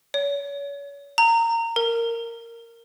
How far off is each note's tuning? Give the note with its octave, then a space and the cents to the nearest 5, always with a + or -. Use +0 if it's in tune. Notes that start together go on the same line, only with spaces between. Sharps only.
C#5 +35
A#5 -20
A#4 -10